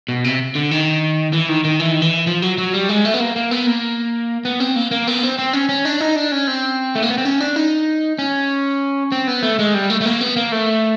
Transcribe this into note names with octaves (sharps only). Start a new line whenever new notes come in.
B2
C3
D3
D#3
E3
D#3
D#3
E3
D#3
E3
F3
F#3
F#3
G3
G#3
A3
B3
A#3
A#3
B3
A#3
B3
C4
A#3
A#3
B3
C4
C4
C#4
C#4
D4
D#4
D4
C#4
C4
A3
A#3
B3
C4
C#4
D4
D#4
C#4
C4
B3
A3
G#3
G3
A3
A3
A#3
B3
A#3
A3